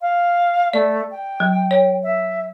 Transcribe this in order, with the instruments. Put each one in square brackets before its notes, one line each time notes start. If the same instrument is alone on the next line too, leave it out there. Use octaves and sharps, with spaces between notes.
[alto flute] F5
[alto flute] A3 [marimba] D5
[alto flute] G5
[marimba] F#3
C#5
[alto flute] E5